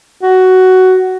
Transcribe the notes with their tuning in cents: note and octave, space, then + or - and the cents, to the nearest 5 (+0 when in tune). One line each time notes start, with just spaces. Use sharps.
F#4 +10